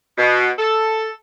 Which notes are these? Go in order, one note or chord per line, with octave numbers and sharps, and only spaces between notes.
B2
A4